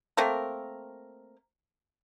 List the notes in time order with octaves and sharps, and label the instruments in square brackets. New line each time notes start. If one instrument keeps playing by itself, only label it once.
[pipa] A3 A#3 C4 A#4